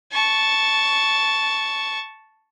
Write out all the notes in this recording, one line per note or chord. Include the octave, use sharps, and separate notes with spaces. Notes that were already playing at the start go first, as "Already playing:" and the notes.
A5 C#6